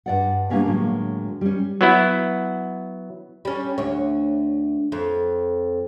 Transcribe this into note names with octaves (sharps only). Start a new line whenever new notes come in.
G2 D5 F#5
G3 A#3 B3 C#4 D4
A2 D3 F#3 G#3 A#3
G3 C#4
F#3 B3 E4
G3 C#4
D2 C#5
F2